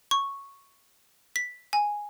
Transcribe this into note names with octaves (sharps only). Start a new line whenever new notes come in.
C#6
B6
G#5